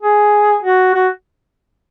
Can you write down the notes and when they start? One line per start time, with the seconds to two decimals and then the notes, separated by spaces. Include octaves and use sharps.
0.02 G#4
0.63 F#4
0.94 F#4